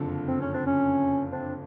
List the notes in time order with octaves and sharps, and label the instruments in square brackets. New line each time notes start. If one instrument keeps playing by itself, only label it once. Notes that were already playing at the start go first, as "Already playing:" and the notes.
Already playing: [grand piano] F#1 F2 D3
[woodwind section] C4
C#4
C4 D4
C#4
C4 D4